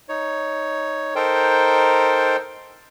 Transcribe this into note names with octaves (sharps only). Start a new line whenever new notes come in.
D#4 C#5
D#4 A4 A#4 C5 G5